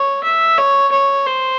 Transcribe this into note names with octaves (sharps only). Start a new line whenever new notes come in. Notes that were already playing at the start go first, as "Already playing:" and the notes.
Already playing: C#5
E5
C#5
C#5
C5